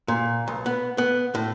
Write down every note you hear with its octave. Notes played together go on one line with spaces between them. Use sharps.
A#2
B1
B3
B3
A2